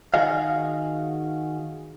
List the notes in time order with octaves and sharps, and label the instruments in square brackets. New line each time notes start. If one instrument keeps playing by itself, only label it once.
[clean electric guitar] D#3 F#4 G#4 D#5 F5